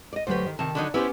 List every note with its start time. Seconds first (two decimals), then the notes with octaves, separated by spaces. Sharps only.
0.13 D5 D#5
0.27 D2 F#3 G4 B4 C5
0.46 D#3
0.59 C3 D#3 A5
0.75 D3 F#3 D#4
0.94 B3 C#4 E4 G4 C5